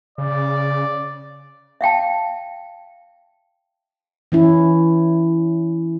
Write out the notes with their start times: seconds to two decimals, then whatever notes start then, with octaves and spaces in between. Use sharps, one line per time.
0.18 C#3 D5
1.81 E5 F5 G5 A5
4.32 E3 C#4 E4